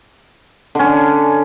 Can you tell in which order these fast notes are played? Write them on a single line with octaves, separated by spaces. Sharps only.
D3 C#4 D4